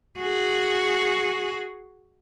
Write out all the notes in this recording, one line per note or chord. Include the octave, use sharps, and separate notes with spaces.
F#4 G#4